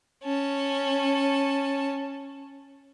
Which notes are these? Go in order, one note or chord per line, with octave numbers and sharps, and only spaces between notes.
C#4 A5